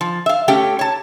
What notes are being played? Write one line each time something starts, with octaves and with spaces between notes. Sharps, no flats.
F3
E5 F5
A3 C#4 G4 C#5 G5
C#5 A5